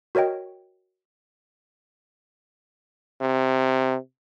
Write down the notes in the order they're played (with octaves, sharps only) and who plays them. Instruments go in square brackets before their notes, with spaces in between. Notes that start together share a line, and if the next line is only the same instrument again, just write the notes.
[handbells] F#4 A#4 C#5 D#5 G5
[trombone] C3